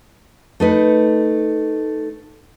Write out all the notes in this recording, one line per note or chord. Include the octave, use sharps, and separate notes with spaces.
A3 D#4 B4